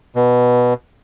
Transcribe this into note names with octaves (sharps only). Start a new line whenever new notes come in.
B2